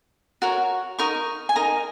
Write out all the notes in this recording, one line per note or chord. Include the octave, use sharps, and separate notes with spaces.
F#4 A#4 C#5
D#4 A#4 D#5 C#6
G#5
D#4 A#4 D#5 A#5